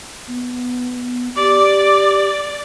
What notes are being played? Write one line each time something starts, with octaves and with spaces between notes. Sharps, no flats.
B3
G4 D5 D6